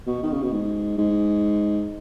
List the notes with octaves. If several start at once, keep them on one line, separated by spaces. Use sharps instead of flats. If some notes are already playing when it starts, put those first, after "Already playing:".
B2
D#3
C#3
B2
G#2
G#2